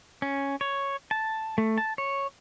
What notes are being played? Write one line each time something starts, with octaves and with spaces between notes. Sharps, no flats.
C#4
C#5
A5
A3
A5
C#5